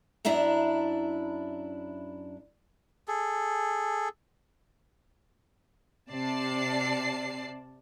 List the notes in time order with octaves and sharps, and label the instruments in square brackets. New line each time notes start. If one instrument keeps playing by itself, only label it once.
[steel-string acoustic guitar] F#2 D4 E4 E5 A#5
[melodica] G#4 A4
[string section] C3 D5 A5 C7